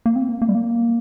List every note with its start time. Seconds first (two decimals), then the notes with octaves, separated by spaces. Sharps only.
0.06 A#3
0.16 C4
0.28 A#3
0.42 A#3
0.49 G3
0.55 A#3